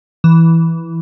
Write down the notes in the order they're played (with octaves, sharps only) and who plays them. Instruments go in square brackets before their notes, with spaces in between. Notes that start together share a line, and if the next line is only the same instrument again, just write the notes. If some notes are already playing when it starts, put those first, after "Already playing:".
[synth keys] E3